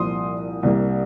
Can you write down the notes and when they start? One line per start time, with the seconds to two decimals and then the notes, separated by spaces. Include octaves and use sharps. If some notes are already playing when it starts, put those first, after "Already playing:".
Already playing: C2 A#2 F3 C6 D#6
0.63 C2 C3 G3 A#3